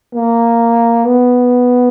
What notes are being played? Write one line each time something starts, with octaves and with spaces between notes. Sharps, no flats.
A#3
B3